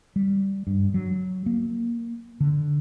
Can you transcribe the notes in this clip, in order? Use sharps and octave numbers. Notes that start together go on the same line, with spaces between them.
G3
G2
F#3
A#3
D3